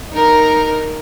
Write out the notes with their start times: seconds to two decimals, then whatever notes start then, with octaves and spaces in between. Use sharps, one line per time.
0.13 D#4 A#4